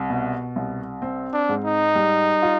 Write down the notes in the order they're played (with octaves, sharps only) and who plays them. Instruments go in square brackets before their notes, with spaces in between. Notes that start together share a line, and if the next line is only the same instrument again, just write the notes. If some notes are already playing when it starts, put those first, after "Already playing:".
Already playing: [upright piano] C2
B2
C2
C4
[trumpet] D4
[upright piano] G#2
[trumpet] D#4
[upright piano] G3
F4